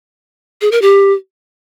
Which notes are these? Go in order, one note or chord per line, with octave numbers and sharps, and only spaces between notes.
G#4
A#4
G4